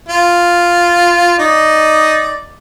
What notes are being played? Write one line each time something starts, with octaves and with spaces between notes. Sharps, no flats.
F4
D#4 D5 D#5